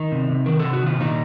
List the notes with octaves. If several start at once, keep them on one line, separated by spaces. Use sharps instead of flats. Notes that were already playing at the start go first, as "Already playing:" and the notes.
Already playing: D#3 D#4
C3
C3
D#3 A#4
A4
C3
F#4
D#3 F4
A#2 D#3 D#4